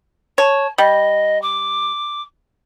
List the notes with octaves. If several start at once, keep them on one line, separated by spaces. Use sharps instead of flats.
C#5 A5
G3 D#5
D6